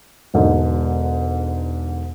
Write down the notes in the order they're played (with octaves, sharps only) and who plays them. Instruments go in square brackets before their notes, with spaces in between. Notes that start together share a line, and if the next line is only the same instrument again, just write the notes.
[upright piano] E1 G#2 D3